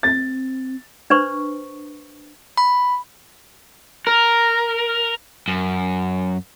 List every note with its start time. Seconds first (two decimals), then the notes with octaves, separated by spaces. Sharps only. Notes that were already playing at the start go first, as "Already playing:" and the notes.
0.03 C4 A6
1.10 D4 B4 C5 C#6
2.57 B5
4.07 A#4
5.48 F#2